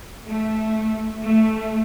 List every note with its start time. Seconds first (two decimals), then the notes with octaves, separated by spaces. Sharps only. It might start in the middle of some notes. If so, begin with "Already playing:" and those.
0.25 A3
1.23 A3